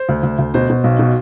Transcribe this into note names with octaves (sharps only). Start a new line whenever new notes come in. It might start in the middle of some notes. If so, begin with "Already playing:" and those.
Already playing: C5
D2
D2
D2
B2 C5
B2
B1
B2